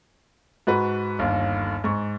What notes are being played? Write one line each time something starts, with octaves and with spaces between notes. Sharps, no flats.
G#2 F#4 B4
G1 D#2
G#2 C#6